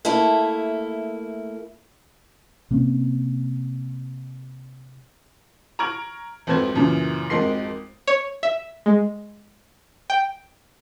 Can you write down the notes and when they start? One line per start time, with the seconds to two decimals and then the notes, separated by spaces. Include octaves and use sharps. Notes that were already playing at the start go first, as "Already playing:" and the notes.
0.05 A3 A#3 E4 A4
2.71 C3 A#3 C4 C#4
5.79 A#5 C#6 F6 G#6 D7 F#7
6.47 G#1 F2 A4 B4 C5 G#6
6.75 F#2 A#2 C#3 E3
7.30 G#1 F2 G#3 A#4 C6 C7
8.07 C#5
8.43 E5
8.86 G#3
10.10 G5